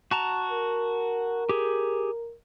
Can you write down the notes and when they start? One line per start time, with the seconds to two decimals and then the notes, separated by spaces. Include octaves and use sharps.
0.11 F#4 A5 A#5
0.50 A#4
1.49 G4 G#4